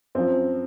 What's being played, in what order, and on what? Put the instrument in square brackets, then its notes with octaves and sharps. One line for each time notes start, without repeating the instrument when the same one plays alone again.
[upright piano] F#2 F3 C4